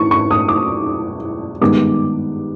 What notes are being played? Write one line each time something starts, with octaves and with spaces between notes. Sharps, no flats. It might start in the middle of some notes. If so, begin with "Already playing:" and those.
Already playing: E3 C#6
C#6
D#6
D6
G2 D#3 G#3 B3 D6